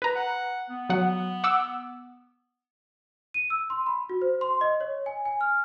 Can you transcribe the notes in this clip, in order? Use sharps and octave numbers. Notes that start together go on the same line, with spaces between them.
B4 A#5
F#5
B3
F#3 F#5
F#5 D6 E6
D#7
E6
C6
B5
F#4
C5
C6
D#5
C#5
G#5
G#5
F6